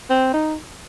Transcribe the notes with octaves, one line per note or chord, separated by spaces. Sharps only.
C4
D#4